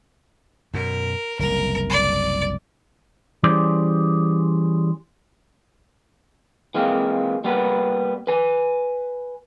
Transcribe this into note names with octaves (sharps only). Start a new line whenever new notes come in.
F#2 B2 A#4
F#1 C2 A#4
D5
E3 G3 C#4 G#4 C5 D5
E3 G#3 A#3 C4 F4
G3 A#3 B3 B4
B4 G#5